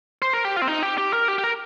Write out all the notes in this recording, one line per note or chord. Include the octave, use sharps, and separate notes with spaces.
C5
A#4
G4
F4
C4
D#4
G4
G4
A#4
G4
G4
A#4